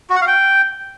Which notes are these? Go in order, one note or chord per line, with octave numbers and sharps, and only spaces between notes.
F#4
F#5
F5
G5